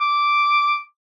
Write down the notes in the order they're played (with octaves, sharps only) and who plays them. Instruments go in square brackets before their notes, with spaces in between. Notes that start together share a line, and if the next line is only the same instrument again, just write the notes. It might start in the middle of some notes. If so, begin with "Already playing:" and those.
[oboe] D6